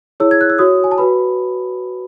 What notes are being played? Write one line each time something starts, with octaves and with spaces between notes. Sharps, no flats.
E4 G#4 C#5 E6
G#6
F#6
E6
F#4 C#5 D#6
G#5
A5
F#4 B4 B5